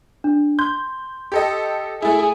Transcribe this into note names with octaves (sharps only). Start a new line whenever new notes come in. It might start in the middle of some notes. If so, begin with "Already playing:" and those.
D4
C6 G6
G4 A4 D#5
A3 E4 G#4